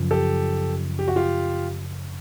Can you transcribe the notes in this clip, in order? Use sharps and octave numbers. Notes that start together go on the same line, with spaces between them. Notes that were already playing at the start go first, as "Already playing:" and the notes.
Already playing: F#2 C#3 F3
G4 A4
G4
F#4
F4 G4